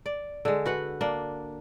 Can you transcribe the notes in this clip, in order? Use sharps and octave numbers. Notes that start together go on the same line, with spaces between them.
D5
D3 G#3
F#4 B4 F#5
A#3 D4